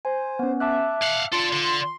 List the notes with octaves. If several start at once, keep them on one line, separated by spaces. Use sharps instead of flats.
C5 G#5
B3 C#4
E5 A5 D6 F#6
F5 F#5
F4 A4 D5 C6
D3 C6